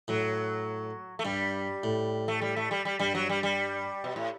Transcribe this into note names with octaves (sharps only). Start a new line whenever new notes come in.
A2 F#3
A3
G2 G3
A2
A3
G3
A3
G3
G3
G2 G3
F#3
G3
G3
B2
A2